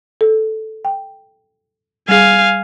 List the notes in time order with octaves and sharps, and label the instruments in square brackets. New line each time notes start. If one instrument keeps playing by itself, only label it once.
[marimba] A4
G5
[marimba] G3 G#4 [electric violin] F5 G#5